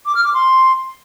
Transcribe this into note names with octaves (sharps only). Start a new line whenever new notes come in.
D6
F6
D6
C6